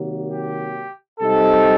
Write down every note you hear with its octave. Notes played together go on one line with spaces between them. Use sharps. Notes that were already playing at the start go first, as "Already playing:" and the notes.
Already playing: C3 D#3 F#3 A#3
G4
C3 G3 C4 D#4 A4